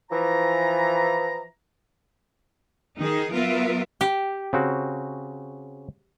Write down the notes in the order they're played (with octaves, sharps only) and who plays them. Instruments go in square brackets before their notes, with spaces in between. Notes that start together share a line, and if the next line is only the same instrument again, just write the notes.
[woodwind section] E3 F3 A#5
[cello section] D#3 D#4 G#4
F#3 B3 F4 A#4 E5
[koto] G4
[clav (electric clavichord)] C#3 C4 F#4